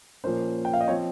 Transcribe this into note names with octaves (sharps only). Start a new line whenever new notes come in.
A#2 F3 A#3 C#4 C5
G5
F5
D#5
F3 C4 C#5